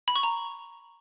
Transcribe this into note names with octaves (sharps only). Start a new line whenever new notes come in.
B5
C#6
A#5